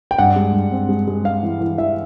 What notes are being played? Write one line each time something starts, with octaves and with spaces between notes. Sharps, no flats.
G5
G2 F#5
G#3
G2
C4
G#3
G#3
G#3 F5
E3
E3
E3 E5